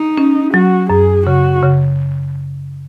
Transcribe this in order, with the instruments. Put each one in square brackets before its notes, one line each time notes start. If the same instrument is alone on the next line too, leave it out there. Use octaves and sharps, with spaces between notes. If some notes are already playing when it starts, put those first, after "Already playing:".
Already playing: [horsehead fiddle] D#4
[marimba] C#4
[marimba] F#3 [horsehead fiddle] F#4
[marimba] F#2 [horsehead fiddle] G#4
[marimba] C#3 [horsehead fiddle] F#4
[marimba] C#3